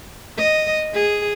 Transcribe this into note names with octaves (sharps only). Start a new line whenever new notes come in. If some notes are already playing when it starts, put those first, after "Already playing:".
D#5
G#4